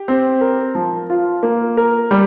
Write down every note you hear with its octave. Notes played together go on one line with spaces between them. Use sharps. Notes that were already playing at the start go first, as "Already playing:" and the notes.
Already playing: G4
C4
A#4
F3
F4
A#3
A#4
G3